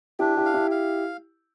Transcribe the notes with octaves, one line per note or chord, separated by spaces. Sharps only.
D4 E4 G4
E4 G4
F5
E4 G4
F5